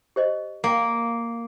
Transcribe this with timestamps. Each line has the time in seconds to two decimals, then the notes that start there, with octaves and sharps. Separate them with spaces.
0.16 G4 C5 D#5
0.64 A#3 F5 G5